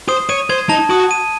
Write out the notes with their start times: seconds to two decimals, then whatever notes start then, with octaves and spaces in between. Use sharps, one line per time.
0.09 C5 D#6
0.29 C#5 D#7
0.50 C5 G#6
0.69 D#4 A5
0.90 F#4 D#6
1.11 D#7